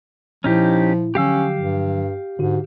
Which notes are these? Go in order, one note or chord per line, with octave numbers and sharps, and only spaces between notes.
A#2 F3 C#4 D#4 E4 G4
D3 F3 F#3 C#4 G4 F5 E6
G2
G#2 D3 F#4